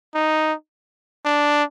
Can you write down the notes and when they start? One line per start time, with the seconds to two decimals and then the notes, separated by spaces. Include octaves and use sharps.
0.15 D#4
1.25 D4